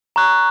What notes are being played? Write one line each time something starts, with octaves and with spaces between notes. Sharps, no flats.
A#5 C#6 F#6